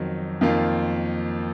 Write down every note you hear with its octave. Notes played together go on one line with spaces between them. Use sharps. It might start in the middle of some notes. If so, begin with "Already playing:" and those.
Already playing: F2 D#3 F#3
F2 D#3 A#3 F4